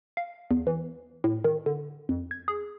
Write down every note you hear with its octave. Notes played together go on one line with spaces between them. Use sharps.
F5
E2
E3
A2
D#3
D3
F2
G#6
G#4